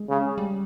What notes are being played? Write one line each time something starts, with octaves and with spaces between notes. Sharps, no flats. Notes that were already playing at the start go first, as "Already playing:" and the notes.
Already playing: G#3
C#3
G3